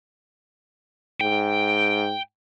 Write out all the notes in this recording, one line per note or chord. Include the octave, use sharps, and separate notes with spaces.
G#2 G5